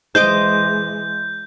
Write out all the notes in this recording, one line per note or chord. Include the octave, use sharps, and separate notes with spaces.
E3 G#3 C5 D#5 D6 G6